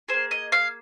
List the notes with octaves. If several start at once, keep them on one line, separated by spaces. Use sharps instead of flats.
A#3 G#4 C5
D#5
F5